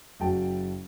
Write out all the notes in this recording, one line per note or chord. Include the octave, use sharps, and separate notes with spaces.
F#1 F#4 G5 A5